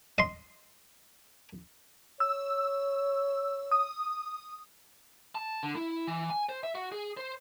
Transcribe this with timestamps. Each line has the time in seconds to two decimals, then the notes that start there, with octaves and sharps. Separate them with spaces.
0.18 D#5 C6
2.20 C#5 E6
3.71 D#6
5.35 A5
5.63 D3
5.75 E4
6.07 E3
6.30 G#5
6.49 C5
6.63 E5
6.75 F#4
6.92 G#4
7.17 C5